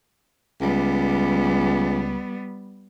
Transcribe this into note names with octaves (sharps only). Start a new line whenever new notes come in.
C#2 G3 B3